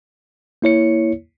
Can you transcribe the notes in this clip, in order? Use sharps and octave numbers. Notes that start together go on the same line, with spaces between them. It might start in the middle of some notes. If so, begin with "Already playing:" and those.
A#3 E4 C#5 C#7